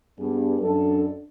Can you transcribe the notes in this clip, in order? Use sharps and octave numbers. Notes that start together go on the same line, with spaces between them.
G2 B3 G#4
F#2 D4 A4